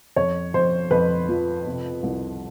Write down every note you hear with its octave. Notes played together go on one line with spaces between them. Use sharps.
F2 C#5
F2 C5
F2 B4
F3
C3
C2